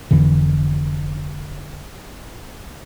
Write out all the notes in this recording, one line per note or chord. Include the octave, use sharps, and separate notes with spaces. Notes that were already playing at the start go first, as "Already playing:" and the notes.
F1 F2 D3 E3